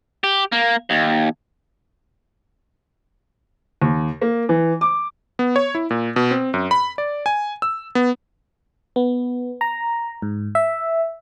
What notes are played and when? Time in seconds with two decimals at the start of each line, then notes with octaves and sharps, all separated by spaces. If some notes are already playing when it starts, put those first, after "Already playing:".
0.24 G4
0.52 A#3
0.90 D#2
3.82 D#2
4.21 A#3
4.49 E3
4.81 D6
5.39 B3
5.56 C#5
5.75 E4
5.90 A#2
6.16 B2
6.31 C4
6.54 F#2
6.71 B5
6.98 D5
7.26 G#5
7.62 E6
7.95 B3
8.96 B3
9.61 A#5
10.22 G#2
10.55 E5